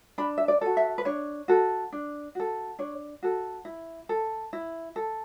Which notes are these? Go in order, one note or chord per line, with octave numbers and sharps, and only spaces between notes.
D4 B5
E5
D5
F#4 A4
E5
B4
D4 C#5
F#4 A4
D4
F#4 A4
D4 C#5
F#4 A4
E4
A4
E4
A4